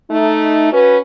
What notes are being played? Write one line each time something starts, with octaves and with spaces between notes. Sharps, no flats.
A3 D#4
C#4 F#4 B4